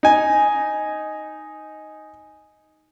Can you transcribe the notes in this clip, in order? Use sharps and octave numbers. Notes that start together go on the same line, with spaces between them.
D#4 G#5